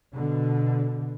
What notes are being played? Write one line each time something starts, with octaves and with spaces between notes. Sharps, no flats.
B2 D3